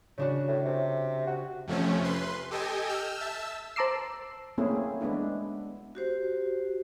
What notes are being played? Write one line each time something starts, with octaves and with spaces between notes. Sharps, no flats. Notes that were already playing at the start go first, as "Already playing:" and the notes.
C#3 D4 F#4
A2
C3
F#4
F2 C3 F3 A3 C#4
B4 C6
G4 A4 D#5 G5 G#5
E6 F6 G6
E5 A5 E6
C5 A5 A#5 D6 E6 C7
A3 A#3 C4 C#4 E4 G#4
G#3 B3 D4 E4
F#4 G4 C5